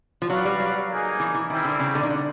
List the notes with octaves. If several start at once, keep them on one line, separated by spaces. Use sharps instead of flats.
F3
F#3 F#4 B4 D5 F5
G3
F#3
A#3 D#4 G#4
E3
E3
D#3 G3 C4 E4
D3
C#3
D3
D#3
D3